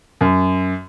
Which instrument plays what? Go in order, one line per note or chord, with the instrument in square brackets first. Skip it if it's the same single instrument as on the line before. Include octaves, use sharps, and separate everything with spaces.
[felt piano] F#2